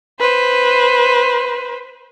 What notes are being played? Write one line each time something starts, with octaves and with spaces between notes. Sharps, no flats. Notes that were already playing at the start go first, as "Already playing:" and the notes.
B4 C5